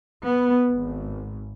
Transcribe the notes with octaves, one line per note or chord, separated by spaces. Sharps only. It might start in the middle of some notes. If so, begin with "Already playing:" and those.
B3
G#1